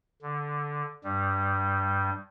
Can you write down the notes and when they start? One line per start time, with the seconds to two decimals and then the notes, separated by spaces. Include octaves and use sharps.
0.22 D3
1.04 G2 G3